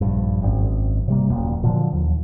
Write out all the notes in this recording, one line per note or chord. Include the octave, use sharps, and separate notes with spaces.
A#1 G2
G#1 F#2
C3 G3 A#3
D#1 F#2 F#3 A#3
A#2 D3 F3 F#3
D#2